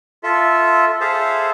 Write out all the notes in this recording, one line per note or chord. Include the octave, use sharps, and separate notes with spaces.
F4 A4 E5
G#4 A4 C5 E5 F5